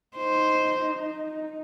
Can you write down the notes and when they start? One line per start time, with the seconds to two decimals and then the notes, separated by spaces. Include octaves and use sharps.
0.17 D#4 C5